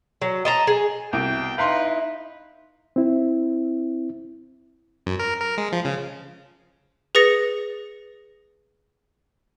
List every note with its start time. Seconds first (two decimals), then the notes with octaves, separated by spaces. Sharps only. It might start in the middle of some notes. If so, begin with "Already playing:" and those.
0.22 F#3
0.45 D#5 A5 A#5
0.67 G#4
1.13 C2 B2 G5 D7
1.58 D#4 E4 B4 F5 A#5 C6
2.96 C4 E4
5.06 F#2
5.19 A#4
5.40 A#4
5.58 G#3
5.73 F3
5.85 C#3
7.15 G#4 B4 D#6 A6 A#6 C#7